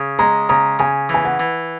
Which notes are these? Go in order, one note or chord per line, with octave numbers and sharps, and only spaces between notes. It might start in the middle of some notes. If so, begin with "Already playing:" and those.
Already playing: C#3
G#3 A#5
C#3 A#5
C#3 G#5
E3 G#5
F#5
E3